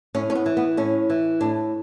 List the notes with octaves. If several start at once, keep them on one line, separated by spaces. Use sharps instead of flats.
A2 C#4
C#4
B3
E3
B3
A2 C#4
E3
A2 D4